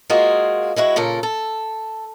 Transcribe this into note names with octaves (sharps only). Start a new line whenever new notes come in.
G#3 A#3 F4 F#4 G#4
G#3 E4 F#4 B4
A#2 C#3 A4 A#4
A4